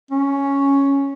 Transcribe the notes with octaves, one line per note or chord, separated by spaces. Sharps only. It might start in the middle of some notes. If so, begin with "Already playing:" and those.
C#4